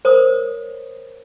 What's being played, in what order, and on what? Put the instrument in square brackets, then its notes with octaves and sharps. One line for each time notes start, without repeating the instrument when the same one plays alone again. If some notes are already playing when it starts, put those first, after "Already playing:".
[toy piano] A#4 C5 C#5 D#6